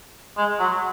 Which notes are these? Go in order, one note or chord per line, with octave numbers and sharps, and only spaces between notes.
G#3
F#3